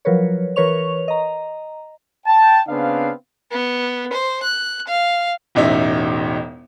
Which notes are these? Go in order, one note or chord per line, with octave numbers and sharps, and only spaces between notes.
F3 F#3 A#4 B4 C#5
E3 A#4 B4 C#5 C#6 F7
D#5 A#5
G5 A5
C#3 B3 C4 D4 F5
B3
C5
F#6
F5
E1 A1 D#4 E5